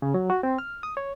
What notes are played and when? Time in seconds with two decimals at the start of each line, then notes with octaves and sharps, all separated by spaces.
0.02 C#3
0.14 F#3
0.30 F#4
0.43 C4
0.58 F6
0.83 D#6
0.97 C#5